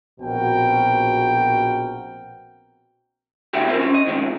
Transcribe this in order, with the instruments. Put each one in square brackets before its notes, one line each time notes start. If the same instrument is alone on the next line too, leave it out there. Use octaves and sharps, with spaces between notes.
[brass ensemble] A#1 B2 C4 F#4 A#4 G5
[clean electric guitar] D3 D4 E4 F#4 G4
C4 E4 F4 A#4 C5
C#4 C5
D#5
C3 D#3 F3 G#3